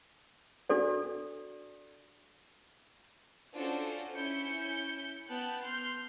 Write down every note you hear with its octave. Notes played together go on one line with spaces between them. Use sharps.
D4 F#4 A4 D5
C#4 D4 F4 F#4 A4 C5
C#4 E4 G6 C#7
B3 G5 A5 F#6
C6 F6 G6